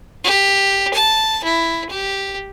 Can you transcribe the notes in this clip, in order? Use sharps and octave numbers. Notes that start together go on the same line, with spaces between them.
G4
A5
E4
G4